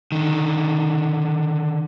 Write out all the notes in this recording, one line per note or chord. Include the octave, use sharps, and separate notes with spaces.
D3 D#3